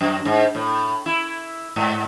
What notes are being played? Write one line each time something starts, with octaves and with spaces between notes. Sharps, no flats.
F#2
G#2
A2
E4
G#2